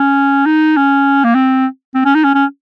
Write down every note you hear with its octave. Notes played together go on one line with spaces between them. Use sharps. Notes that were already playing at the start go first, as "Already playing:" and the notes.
Already playing: C#4
D#4
C#4
A#3
C4
C4
C#4
D#4
C#4
C#4